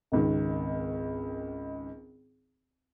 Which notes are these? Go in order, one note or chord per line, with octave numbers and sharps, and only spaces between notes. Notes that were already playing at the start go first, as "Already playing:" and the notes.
G#1 C#2 D#3